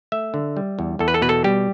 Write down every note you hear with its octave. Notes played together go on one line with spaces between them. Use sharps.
A3 E5
D3
G3
E2
E2 A4
B4
A4
B2 B4
A4
G3 G4